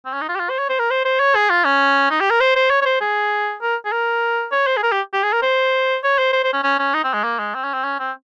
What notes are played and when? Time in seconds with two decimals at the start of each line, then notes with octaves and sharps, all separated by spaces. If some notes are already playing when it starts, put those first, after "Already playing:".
0.06 C4
0.13 C#4
0.21 D#4
0.29 F4
0.36 G4
0.40 F4
0.49 C5
0.59 C#5
0.69 C5
0.79 A#4
0.90 C5
1.05 C5
1.20 C#5
1.35 G#4
1.50 F4
1.65 C#4
2.11 D#4
2.20 G4
2.30 A#4
2.40 C5
2.56 C5
2.70 C#5
2.82 C#5
2.85 C5
3.01 G#4
3.62 A#4
3.85 G#4
3.92 A#4
4.52 C#5
4.67 C5
4.77 G#4
4.83 A#4
4.92 G4
5.13 G4
5.23 G#4
5.33 A#4
5.43 C5
6.04 C#5
6.18 C5
6.33 C5
6.44 C5
6.53 C#4
6.64 C#4
6.79 C#4
6.94 D#4
7.04 C4
7.13 G#3
7.24 A#3
7.39 G#3
7.55 C4
7.64 C#4
7.74 C4
7.84 C#4
7.99 C4